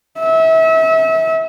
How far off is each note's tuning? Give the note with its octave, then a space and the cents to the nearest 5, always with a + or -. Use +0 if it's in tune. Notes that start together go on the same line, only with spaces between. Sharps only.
E5 -30